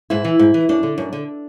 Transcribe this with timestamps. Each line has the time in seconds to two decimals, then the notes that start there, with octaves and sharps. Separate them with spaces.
0.10 G#2 E4
0.25 E3
0.39 G#2
0.54 E3
0.69 F#2 D4
0.83 D3
0.98 F#2
1.13 D3